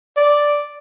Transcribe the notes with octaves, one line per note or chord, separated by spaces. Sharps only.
D5